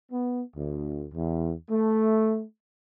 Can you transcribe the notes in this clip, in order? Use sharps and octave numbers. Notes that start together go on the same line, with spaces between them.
B3
D2
E2
A3